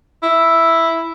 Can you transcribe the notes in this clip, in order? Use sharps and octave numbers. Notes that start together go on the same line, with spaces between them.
E4